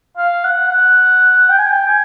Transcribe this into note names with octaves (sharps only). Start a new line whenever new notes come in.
F5
F#5
F#5
G5
G#5
G5
G#5